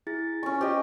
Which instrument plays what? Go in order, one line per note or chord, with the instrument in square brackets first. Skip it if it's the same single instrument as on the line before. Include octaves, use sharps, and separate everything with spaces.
[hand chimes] E4 G#4 A6
[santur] C#4 C#6 [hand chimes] G#5
[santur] G4 D#5 [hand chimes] C5